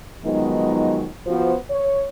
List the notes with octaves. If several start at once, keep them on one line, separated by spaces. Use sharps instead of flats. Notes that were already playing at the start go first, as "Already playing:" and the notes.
D#3 F3 F#3 G#3 B3 D#4
F3 B3 F#4 C5
C#5